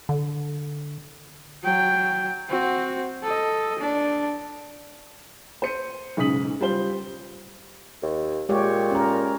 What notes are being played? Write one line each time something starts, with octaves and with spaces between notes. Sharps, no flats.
D3
F#3 G5
C4 F#4
A4 D#5
D4
C5 C#7 D#7
B1 G#2 C#3 D#6 B6 F#7
G3 F4 C5 G7
D#2
A#2 G#3 G4 C#5
C#4 A#4